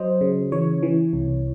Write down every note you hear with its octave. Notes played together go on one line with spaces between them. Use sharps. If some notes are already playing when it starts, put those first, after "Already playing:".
Already playing: F#3 C5 D#5
C#3
E3 C#5
E3
C2